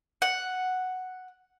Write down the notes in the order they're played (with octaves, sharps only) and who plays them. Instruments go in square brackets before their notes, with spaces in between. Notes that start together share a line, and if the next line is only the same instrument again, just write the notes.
[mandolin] F#5